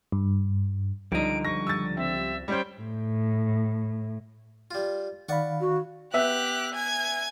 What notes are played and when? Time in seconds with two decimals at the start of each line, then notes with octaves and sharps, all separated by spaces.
0.12 G2
1.12 C#2 D3 F3 G3 D#4 D7
1.45 C#6 A#6
1.67 E6 A6
1.97 C4 E5
2.48 G3 C#4 C5 G5
2.81 A2
4.71 G3 F4
5.29 D#3 D5 F5 F#5 B5 C#6
5.60 F#4
6.14 B3 G4 E5 F#6
6.74 G#5 G#6